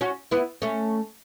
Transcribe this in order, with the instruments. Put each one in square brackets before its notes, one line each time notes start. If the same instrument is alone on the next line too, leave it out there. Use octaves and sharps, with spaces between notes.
[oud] C#4 F#4
B3 E4
A3 C#4